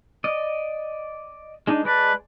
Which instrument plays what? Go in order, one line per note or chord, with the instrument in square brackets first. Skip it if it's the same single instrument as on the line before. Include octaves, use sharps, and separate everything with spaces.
[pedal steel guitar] D5 D#5
G#3 D4 D#4
[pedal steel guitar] G#3 D5 A5 [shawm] B4